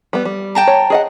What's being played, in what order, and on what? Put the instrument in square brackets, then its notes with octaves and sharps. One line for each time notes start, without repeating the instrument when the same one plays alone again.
[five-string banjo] G3 B3
G3
[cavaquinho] G5 A5 A#5
[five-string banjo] C#5
G#4 D#5 F#5